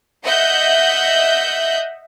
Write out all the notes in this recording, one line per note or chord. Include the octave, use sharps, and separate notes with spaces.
D#5 E5 F#5 F#6 G6